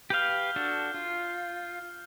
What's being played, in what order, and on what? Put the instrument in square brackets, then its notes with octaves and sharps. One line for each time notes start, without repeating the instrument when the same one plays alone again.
[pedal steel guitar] G4 B4 F5 [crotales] F6 G6
[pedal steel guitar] D4 F#4 A4
F4